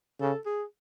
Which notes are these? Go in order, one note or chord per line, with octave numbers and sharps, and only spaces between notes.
C#3 A4
G#4